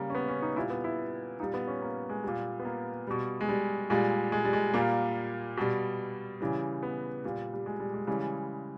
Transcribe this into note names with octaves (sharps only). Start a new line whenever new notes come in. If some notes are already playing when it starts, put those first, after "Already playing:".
Already playing: C#3 G3 A#3
C#4
B3
C#4
D#4
A#2 G3 E4
B3
E4
A#2 G3 D#4
B3
C#4
A#3
G#3
A#2 G3
B3
A#3
B2 G3
G#3
G3
A#2 G3 G#3
G#3
G3
G#3
A#2 G3 A#3
B2 G3
C#3 E3 G3
B3
A#2 G3
G3
G#3
G3
G#3
C#3 E3 G3 G#3